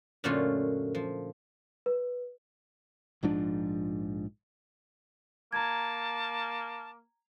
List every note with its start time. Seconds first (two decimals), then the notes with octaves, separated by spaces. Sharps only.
0.24 F#2 A#2 D3 A3 C#4 F4
0.95 F3
1.86 B4
3.23 A#1 G#2 F3 D4
5.53 A#3 A5 A#5 G#6